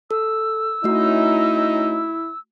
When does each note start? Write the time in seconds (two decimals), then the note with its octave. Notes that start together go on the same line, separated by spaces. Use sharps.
0.11 A4 E6
0.84 A3 C#4 D#4 E4 F#4